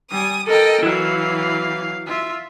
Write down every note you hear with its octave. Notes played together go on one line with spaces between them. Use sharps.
G3 G#5 D#6
A4 A#4 D#5 G5
E3 F#3 E4 F#4 F5
F4 E5